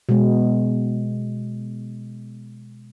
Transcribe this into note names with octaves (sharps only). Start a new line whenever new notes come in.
B2 G#3